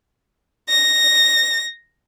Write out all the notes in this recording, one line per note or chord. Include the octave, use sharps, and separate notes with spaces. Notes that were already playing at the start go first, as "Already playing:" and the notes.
A#6